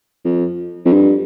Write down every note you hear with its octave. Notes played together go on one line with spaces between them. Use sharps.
F2
F2
G2